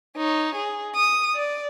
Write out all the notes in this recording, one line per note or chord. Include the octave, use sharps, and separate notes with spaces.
D#4 C#5
G#4
D#6
D5